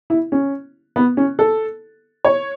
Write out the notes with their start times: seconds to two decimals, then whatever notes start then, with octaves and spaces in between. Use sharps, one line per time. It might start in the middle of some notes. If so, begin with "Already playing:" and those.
0.10 E4
0.32 C#4
0.96 B3
1.17 C#4
1.39 A4
2.25 C#5